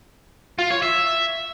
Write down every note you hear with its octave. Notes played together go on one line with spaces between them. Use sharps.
F4
C#5
E5